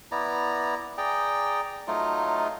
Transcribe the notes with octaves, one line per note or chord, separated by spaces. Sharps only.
B3 E4 D5 A#5
G#4 D5 G5 A#5
F#3 A3 D#4 F4